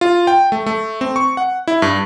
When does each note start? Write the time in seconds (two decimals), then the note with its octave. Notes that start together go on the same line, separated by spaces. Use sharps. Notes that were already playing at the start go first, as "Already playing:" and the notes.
0.01 F4
0.27 G5
0.52 A3
0.66 A3
1.01 C4
1.16 C#6
1.37 F#5
1.68 E4
1.82 G2